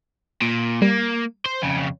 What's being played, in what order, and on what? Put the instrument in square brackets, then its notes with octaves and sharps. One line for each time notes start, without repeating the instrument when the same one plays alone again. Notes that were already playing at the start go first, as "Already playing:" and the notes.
[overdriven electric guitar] A#2
[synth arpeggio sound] G3 [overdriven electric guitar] A#3
[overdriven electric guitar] C5
F2 C#3